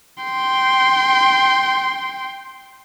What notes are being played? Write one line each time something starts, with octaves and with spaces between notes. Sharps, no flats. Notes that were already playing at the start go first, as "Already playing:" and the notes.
G5 C6